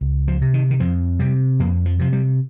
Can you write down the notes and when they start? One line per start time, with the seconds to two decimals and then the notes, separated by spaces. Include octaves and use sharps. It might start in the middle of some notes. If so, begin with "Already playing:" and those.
0.01 C#2
0.28 F3
0.41 C3
0.54 D#3
0.71 D#3
0.80 F2 F3
1.19 C3 G3
1.60 F2 A#3
1.86 F3
1.99 C3 F3
2.13 G3